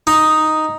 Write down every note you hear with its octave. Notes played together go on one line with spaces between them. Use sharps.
D#4